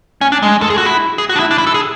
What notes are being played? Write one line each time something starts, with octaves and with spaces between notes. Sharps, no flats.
C#4
D4
G#3
A4
G#4
F#4
E4
G#4
F#4
D4
E4
D4
E4
A4
G#4